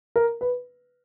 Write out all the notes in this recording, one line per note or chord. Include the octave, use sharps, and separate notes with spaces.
A#4
B4